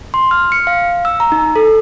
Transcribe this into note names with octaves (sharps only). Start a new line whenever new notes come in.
C6
F6
C#7
F5
E6
A#5
D#4
A4